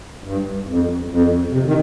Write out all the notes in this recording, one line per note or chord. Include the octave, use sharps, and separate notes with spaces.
G2
F2
F2
C3
D#3